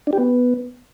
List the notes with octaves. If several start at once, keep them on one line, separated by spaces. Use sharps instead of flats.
D4
G4
B3